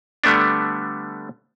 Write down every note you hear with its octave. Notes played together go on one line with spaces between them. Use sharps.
D3 G3 A3 B3 D4